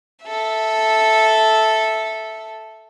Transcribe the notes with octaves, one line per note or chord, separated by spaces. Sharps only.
A4 E5